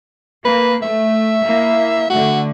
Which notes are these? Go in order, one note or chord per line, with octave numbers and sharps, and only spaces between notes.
A#3 B4
A3 E5
A#3 E4
D3 A3 F#4